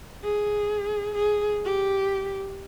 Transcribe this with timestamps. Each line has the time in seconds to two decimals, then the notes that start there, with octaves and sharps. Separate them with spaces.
0.24 G#4
1.14 G#4
1.65 G4